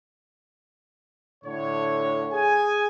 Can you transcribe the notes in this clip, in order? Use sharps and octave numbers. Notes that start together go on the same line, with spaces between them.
A2 D3 C#5
G#4 G#5